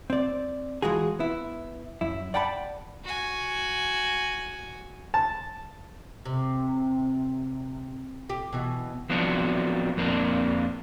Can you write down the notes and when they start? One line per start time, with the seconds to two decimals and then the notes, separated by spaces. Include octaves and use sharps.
0.10 C4 D5
0.82 E3 G#3 F4 F#4 G#4
1.19 B3 E4
2.01 F#2 E4
2.34 D5 F#5 G5 A5 B5
3.04 F#4 G#5
5.14 A5
6.25 C3
8.30 G4
8.53 B2 E3 F#4
9.10 F3 F#3 B3 C4 D4 F#4
9.97 F2 A#3 C4 D4